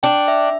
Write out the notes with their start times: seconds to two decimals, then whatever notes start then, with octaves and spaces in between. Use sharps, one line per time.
0.03 D4 G5
0.28 E5